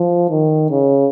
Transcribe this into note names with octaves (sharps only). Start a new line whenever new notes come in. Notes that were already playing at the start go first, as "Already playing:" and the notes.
Already playing: F3
D#3
C#3